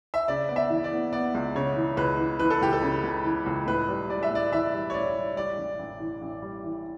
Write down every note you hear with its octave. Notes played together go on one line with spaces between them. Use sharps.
E5
C#3 D5
B3 D5
E5
E3
D5
B3
B3 D5
C#2
C#3 C#5
E3
C#2 B4
E3
E3 B4
A4
C#2 G4
A4
C#3
C#2
E3
C#2
A2 B4
G3
G3 D5
E5
A2 D5
E3 E5
G3
C#5
A1 D5
G3
G3 D5
A1
A1
E3
A1
G3
E3